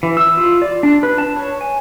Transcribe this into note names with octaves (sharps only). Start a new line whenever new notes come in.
E3
E6
F4
D5
D4
B4
A5
C#5
G#5